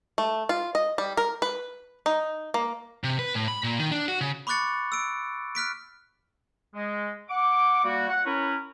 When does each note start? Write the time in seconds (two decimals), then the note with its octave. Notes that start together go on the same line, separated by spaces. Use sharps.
0.18 A3
0.49 F4
0.75 D#5
0.98 G3
1.17 A#4
1.42 B4
2.06 D#4
2.54 A#3
3.04 C3
3.19 B4
3.34 A2
3.48 B5
3.64 A#2
3.79 D#3
3.91 D4
4.08 F#4
4.21 C#3
4.47 B5 C#6 D6 F#6 A6 C#7
4.92 E6 D7
5.55 F6 F#6 B6 D7
6.74 G#3
7.29 F#5 D6
7.83 G3 A#3 F#4
8.08 F#5
8.25 C#4 E4 A#4 B4 C#5